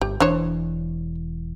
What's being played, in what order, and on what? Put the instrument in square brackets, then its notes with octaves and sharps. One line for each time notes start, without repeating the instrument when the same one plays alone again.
[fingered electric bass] G1 [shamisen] G4
[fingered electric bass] E1 E3 [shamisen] D4 C5 C#5